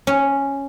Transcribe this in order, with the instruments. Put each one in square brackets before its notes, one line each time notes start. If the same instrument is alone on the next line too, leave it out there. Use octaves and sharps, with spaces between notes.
[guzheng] C#4